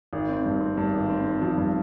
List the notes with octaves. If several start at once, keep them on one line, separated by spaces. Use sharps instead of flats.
G#1
C4
G2
C4
G2
G#1
C4
C4
F3
G2